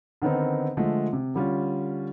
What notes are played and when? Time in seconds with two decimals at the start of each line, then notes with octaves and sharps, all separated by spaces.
0.22 D3 D#3 B3 C4 D#4
0.77 D3 F3 G#3 A3
1.13 C3
1.34 D3 G3 C#4 F4